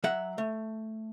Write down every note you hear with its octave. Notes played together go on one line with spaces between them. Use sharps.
F#3 E5 F#5
A3